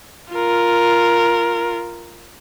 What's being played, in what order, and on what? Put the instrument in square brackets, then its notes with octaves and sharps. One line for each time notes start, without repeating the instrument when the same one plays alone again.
[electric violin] F4 A#4